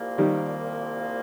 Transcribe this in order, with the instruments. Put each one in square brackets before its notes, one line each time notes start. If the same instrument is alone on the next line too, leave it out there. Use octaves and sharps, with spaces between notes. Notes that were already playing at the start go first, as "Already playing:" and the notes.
Already playing: [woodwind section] C2 A#2 F3 A#3
[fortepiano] D#3 G3